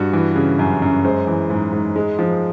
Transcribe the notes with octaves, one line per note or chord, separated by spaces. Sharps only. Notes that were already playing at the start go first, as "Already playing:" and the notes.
Already playing: G2 F#4
E3
C#3
F#2
F#2
G#3 C5
E3
G#2
G#2
G#3
F3